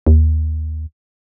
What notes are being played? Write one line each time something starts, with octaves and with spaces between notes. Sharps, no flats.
D#2